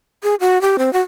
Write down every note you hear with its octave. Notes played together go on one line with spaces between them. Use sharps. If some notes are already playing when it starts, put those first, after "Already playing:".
G#4
F#4
G4
C4
F#4